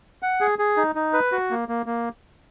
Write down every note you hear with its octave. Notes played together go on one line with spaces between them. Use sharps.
F#5
G#4
G#4
D#4
D#4
B4
F#4
A#3
A#3
A#3